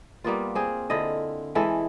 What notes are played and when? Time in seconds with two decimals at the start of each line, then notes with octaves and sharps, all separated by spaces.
0.24 G3 A#3 B3 F4
0.55 C4 G#4
0.90 D3 E4 F4 D#5
1.55 E3 G#3 E4 A4